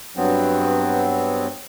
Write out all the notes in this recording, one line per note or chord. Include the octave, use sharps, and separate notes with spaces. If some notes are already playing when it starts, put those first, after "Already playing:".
G2 F#3 B3 C4